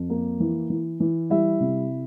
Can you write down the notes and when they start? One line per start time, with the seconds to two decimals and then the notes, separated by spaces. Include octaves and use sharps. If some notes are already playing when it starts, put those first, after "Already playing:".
Already playing: F2
0.10 A#3
0.40 E3
0.70 E3
1.00 E3
1.30 G3 E4 E5
1.60 C3